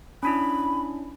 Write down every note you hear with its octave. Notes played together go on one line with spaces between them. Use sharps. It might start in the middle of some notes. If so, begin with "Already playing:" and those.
C#4 D4 E4 B5